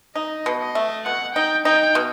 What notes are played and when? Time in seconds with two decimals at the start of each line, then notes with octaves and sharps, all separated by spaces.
0.16 D#4 D#5
0.46 B2
0.60 D#5
0.75 A3
1.05 B2 F#5
1.35 D#4 G5
1.65 D#4 G5
1.95 B2